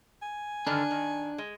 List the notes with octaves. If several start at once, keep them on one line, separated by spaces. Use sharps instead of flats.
G#5
G2 D3 D#3 D4
D#3
G#3